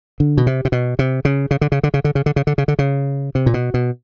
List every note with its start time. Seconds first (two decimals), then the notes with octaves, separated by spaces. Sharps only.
0.20 D3
0.37 B2
0.47 C3
0.65 C3
0.72 B2
0.99 C3
1.25 C#3
1.51 C#3
1.61 D3
1.72 C#3
1.83 D3
1.94 C#3
2.04 D3
2.15 C#3
2.26 D3
2.36 C#3
2.47 D3
2.58 C#3
2.68 D3
2.79 C#3
3.35 C3
3.46 A#2
3.54 B2
3.74 B2